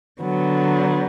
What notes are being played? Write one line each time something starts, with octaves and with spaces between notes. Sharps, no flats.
D3 F#3 B3